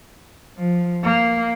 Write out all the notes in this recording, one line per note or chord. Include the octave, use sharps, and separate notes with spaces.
F3
A#3